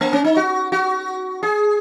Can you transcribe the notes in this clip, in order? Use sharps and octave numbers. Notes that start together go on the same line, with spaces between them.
A#3
C#4
D#4
F#4
F#4
G#4